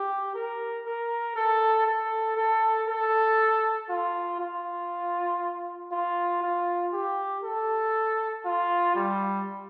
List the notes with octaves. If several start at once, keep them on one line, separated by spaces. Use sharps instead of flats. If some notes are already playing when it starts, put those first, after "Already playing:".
Already playing: G4
A#4
A#4
A4
A4
A4
A4
F4
F4
F4
F4
G4
A4
F4
G3